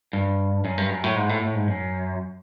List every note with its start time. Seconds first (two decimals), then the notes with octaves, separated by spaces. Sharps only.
0.13 G2
0.65 F#2
0.78 G2
0.90 F#2
1.04 A2
1.16 G#2
1.29 A2
1.42 A2
1.55 G#2
1.68 F#2